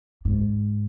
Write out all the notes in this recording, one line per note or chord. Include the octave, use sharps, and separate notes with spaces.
G#2